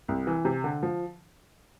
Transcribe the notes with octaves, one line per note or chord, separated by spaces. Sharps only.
C2
E3
C3
D3
F3